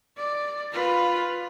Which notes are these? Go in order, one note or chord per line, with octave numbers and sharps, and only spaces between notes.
D5
F4 B4